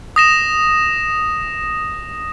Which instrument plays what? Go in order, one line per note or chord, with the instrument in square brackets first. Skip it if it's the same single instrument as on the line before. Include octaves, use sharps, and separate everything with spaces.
[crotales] D#6 A#6 E7